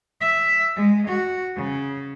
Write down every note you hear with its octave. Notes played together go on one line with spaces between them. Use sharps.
E5
G#3
F#4
C#3